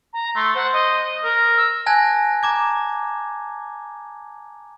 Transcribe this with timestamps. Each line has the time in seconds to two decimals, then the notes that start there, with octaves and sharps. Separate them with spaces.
0.13 A#5
0.35 A3 C6
0.55 C5 F#5
0.73 D#5
1.24 A#4
1.57 E6
1.86 G#5 A5 F#6 G#6 A#6
2.43 A#5 D6 G#6